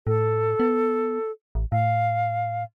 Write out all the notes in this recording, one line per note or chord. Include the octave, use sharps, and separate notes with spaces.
A2 A4
B3
A1
A2 F5